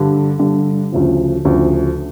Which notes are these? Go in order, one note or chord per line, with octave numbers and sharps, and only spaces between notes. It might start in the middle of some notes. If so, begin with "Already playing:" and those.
Already playing: G2 D3 G3
G2 D3 G3
D2 C#3 F3
D2 C#3 F3